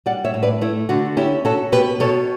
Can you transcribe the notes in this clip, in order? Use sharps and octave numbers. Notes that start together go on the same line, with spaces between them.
G3 D5 F#5
C#5 E5
A2
B4 D5
A3 E4
D3 F#4
C#4 E4 G4
C#4 F#4 A4
B2 G4 B4
B2 A4 C#5